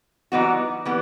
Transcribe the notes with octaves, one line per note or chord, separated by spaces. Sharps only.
E3 G3 B3 D#4 F#4
E3 G3 B3